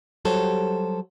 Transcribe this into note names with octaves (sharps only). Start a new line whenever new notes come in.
F#3 G3 G4 A4 C5 C#5